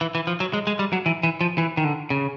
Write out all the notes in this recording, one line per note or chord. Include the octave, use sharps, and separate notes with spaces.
E3
E3
F3
F#3
G#3
G#3
G3
F#3
E3
E3
F3
E3
D#3
D3
C#3